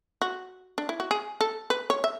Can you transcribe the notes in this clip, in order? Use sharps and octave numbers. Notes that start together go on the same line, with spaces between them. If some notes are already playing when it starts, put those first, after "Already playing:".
F#4
D4
E4
F#4
G#4
A4
B4
C#5
E5